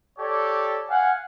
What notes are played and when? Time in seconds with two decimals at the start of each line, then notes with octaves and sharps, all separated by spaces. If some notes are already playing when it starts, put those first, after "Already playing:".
0.19 G4 A4 C#5 D5
0.88 F5 F#5 G#5